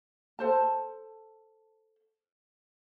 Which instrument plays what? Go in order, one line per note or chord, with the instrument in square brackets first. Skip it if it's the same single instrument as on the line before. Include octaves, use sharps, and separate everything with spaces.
[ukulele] A4 C5 A5